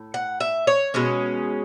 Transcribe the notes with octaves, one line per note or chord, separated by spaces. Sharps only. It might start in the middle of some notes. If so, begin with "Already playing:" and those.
Already playing: A2
F#5
E5
C#5
B2 G#3 C#4